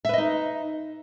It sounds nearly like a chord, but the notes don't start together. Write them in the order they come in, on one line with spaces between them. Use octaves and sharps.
E5 B4 D#5 D#4